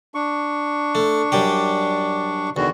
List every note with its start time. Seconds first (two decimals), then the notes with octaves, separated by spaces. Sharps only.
0.15 D4 C#6
0.95 A3
1.32 F#2 G3 G4
2.57 E2 D3 D#3 F#4